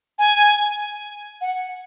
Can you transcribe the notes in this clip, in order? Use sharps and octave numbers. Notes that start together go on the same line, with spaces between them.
G#5
F#5